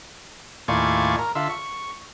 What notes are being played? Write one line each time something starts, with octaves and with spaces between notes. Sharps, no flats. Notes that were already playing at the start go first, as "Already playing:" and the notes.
D#2 A2 F4 D5 G#5 C#6
A#4
D3 F4 E5
C#6